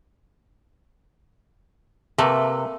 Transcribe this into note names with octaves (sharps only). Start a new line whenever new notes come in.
C3 A3 A#3 B4